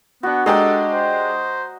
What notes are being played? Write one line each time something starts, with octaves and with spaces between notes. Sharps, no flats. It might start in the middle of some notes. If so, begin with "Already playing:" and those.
B3 D4 F#4
G#3 D4 G4 A4 D#5 A#5
C5